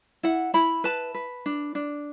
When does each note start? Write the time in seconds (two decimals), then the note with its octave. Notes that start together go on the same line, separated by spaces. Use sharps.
0.23 E4 F#5
0.54 E4 B5
0.84 B4 A5
1.14 B4
1.46 D4
1.75 D4